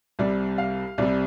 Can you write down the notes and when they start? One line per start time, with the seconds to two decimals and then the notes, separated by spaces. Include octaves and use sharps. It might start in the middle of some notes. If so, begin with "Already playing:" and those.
0.19 C2 C3 G3 D5
0.58 F5
0.98 C2 C3 G3 D5